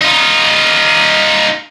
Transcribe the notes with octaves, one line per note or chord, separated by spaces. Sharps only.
D#4 F4